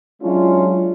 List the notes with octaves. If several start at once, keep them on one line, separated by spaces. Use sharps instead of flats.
F#3 G#3 C#4 D4 E4 F4